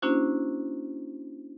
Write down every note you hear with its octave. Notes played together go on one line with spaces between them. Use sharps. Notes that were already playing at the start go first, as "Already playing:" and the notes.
A#3 C#4 D4 E4 F#4 C5